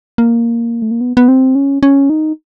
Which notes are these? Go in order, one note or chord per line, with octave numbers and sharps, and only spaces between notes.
A#3
A3
A#3
B3
B3
C4
C#4
C#4
D#4